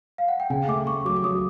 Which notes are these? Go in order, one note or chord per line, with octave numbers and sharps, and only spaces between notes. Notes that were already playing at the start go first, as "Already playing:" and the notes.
F5
F#5
G5
C#3 G#5
A3 D6
A3 C#6
F#3 D6
D6
F#3 D#6